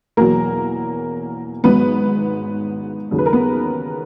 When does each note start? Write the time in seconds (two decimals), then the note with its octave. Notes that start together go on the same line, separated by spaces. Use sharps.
0.17 E2 B2 F#3 A#3 A#4
1.64 G#1 G#2 F#3 B3 B4
3.11 D#2 C#3 F#3
3.18 B4
3.26 A#4
3.32 B3 B4